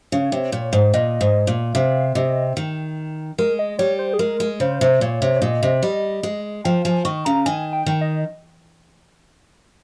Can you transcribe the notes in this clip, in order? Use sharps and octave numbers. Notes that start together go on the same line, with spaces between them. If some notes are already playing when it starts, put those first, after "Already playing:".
C#3 C#5
C3
A#2
G#2
A#2 D#5
G#2
A#2
C3 F5
C3 D#5
D#3
G#3 A#4
D#5
G3 C#5
C5
G#4
G#3 A#4
G#3
C#3 C5
C3
A#2 C#5
C3
C#5
A#2 D#5
C3
G3 D#5
G#3
F3 G5
F3 G#5
D#3 C#6
C#3 A#5
D#3 G#5
G5
D#3
D#5